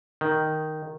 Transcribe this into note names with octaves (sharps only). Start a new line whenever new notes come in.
D#3